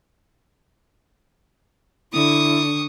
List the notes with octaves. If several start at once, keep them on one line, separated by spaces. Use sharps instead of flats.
D3 E4 C#6 D#6